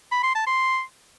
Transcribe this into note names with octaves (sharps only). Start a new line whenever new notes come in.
B5
C6
A5
C6